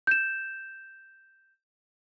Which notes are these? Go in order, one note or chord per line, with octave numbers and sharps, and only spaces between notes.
G6 E7